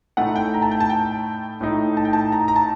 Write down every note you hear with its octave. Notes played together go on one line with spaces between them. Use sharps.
A2 A3 D#4 F#5
G5
A#5
A5
G5
A5
G5
A2 A3 D#4
A5
G5
A5
A#5
A#5
A5